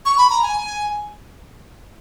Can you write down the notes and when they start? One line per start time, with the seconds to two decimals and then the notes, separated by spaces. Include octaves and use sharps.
0.05 C#6
0.18 B5
0.30 A#5
0.42 G#5